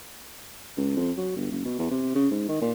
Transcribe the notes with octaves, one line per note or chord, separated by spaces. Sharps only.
C#2
F2
F#3
G1
F#1
B2
E2
C3
C#3
G#2
D#3
A#2